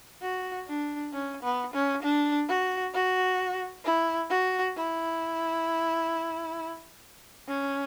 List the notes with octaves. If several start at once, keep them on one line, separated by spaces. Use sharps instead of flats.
F#4
D4
C#4
B3
C#4
D4
F#4
F#4
E4
F#4
E4
C#4